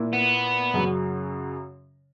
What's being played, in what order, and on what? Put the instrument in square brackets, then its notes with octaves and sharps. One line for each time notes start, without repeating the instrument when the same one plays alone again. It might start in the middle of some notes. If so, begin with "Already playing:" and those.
Already playing: [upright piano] A#2 A#3 E4
[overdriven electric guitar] B3
[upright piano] F#2 C#3 F#3